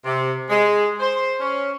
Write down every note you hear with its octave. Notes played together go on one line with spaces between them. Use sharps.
C3
G#3
C5
C#4